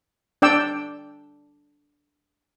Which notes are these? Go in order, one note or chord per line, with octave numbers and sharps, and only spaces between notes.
D4 D5 G5 E6